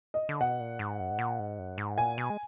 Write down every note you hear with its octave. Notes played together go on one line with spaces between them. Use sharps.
D#5
D3
B2 F#5
A#2
G#2
F#2
G#2
A#2
G#2
F#2
G#2
A#2 G#5
B2
G#3